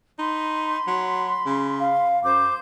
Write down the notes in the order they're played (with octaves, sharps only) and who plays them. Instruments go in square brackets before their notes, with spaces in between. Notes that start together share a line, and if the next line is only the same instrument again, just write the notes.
[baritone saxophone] D#4 [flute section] B5 C6
[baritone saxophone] F#3
C#3
[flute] F5
[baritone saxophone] F#2 [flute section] C5 G6 [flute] D6